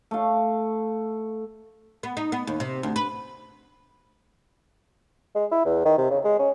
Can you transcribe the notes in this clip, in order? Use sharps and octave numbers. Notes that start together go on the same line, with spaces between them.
A3 F5
B3
D#4
B3
D#2
C3
D2
B4
G#3
E4
E2
D#3
C3
C#3
G#3
C#4